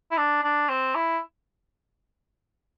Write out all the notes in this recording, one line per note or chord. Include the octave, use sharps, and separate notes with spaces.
E4
D4
D4
C4
E4